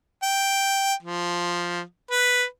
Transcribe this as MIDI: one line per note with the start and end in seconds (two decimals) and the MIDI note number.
0.23 0.94 79
1.03 1.81 53
2.11 2.45 71